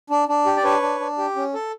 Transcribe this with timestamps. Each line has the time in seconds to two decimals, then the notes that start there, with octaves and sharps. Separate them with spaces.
0.10 D4
0.28 D4
0.46 G4
0.56 D5
0.64 D4 B4 C#5
0.82 D4
1.00 D4
1.18 G4
1.36 C#4
1.54 A4